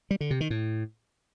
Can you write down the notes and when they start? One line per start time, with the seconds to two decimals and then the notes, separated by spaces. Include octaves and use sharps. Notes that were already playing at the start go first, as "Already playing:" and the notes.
0.11 G3
0.21 D3
0.31 C3
0.40 D#3
0.50 A2